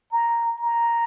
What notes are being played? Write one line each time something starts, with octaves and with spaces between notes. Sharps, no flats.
A#5
A#5